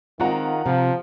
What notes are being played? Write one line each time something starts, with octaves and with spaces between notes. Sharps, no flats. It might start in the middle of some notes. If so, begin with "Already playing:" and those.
D#3 G#3 C4 F4 F#5 A#5
C3 F3